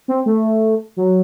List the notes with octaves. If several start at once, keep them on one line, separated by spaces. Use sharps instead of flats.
C4
A3
F#3